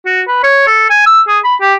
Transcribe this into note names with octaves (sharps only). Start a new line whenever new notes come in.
F#4
B4
C#5
A4
G#5
E6
G#4
B5
G4